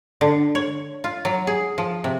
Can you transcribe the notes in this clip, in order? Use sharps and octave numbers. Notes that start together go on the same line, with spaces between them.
D3
C#5
F4
F#3
G#4
F3
C3